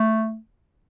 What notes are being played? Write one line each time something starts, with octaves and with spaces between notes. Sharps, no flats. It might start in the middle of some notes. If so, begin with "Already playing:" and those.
Already playing: A3